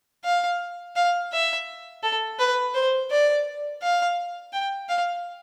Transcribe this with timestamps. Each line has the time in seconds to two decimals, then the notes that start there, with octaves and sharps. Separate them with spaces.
0.24 F5
0.96 F5
1.32 E5
2.03 A4
2.39 B4
2.74 C5
3.11 D5
3.83 F5
4.53 G5
4.89 F5